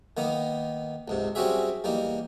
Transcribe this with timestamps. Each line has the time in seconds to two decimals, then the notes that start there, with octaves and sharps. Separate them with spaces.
0.17 D#3 A#3 B3 D#4
1.08 C#2 G#2 C3
1.35 G3 C4 C#4 F#4 G#4 E5
1.84 E2 G3 A#3 D#4